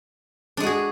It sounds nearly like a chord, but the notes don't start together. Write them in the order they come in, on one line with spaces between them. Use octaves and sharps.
D4 G#3 F#4 G#4